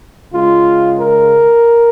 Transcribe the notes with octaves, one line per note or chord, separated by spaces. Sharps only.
C#3 G#3 F4
A#4